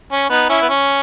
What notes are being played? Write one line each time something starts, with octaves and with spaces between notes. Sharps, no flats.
C#4
B3 D#4
C#4 E4
B3
C#4